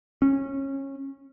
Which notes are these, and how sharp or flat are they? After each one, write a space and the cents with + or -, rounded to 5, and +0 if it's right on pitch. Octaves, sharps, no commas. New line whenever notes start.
C#4 -25